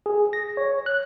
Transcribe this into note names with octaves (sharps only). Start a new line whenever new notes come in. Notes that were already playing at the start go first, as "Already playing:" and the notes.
G#4
A#6
C#5
F#6